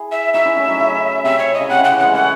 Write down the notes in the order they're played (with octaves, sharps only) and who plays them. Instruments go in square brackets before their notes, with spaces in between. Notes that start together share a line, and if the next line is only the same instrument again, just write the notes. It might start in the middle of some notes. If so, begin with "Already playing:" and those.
Already playing: [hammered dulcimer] E4 G#4
[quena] E5
[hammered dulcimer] D#4 F#4 [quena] E5
[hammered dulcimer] C#4 E4
A3 C#4
F#3
C#3
[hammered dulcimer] C3 [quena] E5
[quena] C#5
D#5
[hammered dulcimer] C#3
[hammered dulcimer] C3 [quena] F#5
[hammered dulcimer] C#3 [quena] F#5
[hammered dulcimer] E3
[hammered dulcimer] G#3 [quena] F#5
[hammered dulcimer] A3 C#4 [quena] F#5